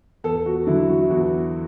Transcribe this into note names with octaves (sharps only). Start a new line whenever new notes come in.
E2 A4
F#4
D3 F#3 E4
F#4
E4
E2 F#4